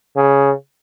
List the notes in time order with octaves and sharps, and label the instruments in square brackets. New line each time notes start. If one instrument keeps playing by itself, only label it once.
[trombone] C#3